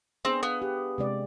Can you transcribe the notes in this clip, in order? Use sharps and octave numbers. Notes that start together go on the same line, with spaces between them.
B3 C4 D4 G#4
B3 F5
G4
C3 G#3 D5